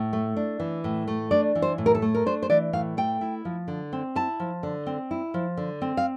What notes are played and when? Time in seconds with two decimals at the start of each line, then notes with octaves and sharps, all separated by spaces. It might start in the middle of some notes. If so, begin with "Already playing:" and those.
Already playing: A2
0.13 A3
0.36 D4
0.60 E3
0.84 A2
1.08 A3
1.31 D4 D5
1.55 E3
1.62 C5
1.78 A2
1.86 A#4
1.95 A4
2.02 A3
2.15 A#4
2.26 D4 C5
2.43 C5
2.50 E3 D5
2.73 A2 F5
2.97 A3 G5
3.21 E4
3.45 F3
3.68 D3
3.93 C4
4.16 E4 A5
4.40 F3
4.63 D3
4.86 C4
5.11 E4
5.34 F3
5.57 D3
5.82 C4
5.97 F5